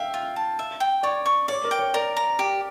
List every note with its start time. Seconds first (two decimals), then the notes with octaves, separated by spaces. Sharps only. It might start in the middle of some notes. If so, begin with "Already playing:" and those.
Already playing: E5 F5 G5
0.14 F4
0.36 A5
0.59 E5
0.80 G5
1.03 C#5 D5
1.26 C#6
1.48 C#5 D5
1.64 A#4
1.71 G5
1.79 C#5
1.94 A#4 D5
2.17 A#5
2.39 G4